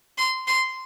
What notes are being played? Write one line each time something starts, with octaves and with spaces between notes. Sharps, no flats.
C6
C6